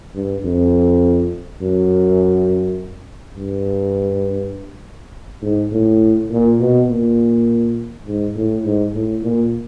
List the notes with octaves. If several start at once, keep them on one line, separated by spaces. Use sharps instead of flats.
G2
F2
F#2
G2
G#2
A2
A#2
B2
A#2
G#2
A2
G#2
A2
A#2